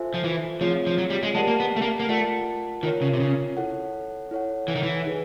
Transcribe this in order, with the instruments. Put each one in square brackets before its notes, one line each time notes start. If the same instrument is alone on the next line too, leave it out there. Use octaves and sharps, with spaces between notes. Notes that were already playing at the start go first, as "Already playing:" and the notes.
Already playing: [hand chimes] F4 A4 C5 E5 G#5
[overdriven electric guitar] F3
E3
[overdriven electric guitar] F3 [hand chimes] A3 C4 F4 G#4 C#5
[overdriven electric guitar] F3
F#3
G3
G#3
[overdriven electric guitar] G#3 [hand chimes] G4 A#4 D5 F#5 A5
[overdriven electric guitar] A#3
B3
A3
A#3
A#3
[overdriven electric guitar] A3 [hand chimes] F4 A#4 D5 F#5 A5
[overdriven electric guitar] D#3 [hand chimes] F4 A#4 C#5
[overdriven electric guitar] C#3
C3
C#3
[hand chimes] E4 A4 C#5 F#5
E4 A4 C#5 F#5
[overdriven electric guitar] E3
D#3
E3
[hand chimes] D#4 G#4 B4